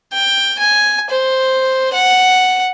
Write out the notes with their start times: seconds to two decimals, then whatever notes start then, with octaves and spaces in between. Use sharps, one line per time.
0.13 G5
0.59 G#5
1.10 C5
1.94 F#5